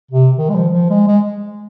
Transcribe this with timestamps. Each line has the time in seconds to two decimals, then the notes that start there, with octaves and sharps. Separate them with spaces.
0.11 C3
0.38 D#3
0.49 G#3
0.55 F3
0.73 F3
0.90 G#3
1.07 G#3